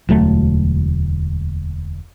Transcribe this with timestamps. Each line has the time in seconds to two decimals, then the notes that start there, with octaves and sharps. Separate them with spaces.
0.09 E1 D2 F#3 A3